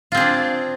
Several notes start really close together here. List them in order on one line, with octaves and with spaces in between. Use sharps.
F4 C4 G#4 D4